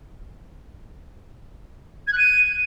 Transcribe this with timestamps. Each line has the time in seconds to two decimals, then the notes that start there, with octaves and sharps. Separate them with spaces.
2.07 G#6
2.12 F#6
2.17 D#7